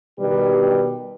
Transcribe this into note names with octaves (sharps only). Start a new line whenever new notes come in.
B2 D#3 G3 G4 B4